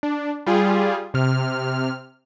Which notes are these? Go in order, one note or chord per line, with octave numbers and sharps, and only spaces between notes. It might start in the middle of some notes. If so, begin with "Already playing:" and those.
D4
G3 F4 G#4
C3 F6